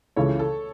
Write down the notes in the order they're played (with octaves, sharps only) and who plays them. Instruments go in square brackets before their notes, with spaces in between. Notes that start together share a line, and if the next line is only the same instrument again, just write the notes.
[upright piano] C#2 C#3 E3 [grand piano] A4 C#5
[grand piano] A4